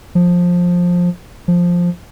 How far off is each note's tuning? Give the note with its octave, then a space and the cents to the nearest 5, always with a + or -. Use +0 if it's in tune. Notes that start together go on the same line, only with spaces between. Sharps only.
F3 +15
F3 +5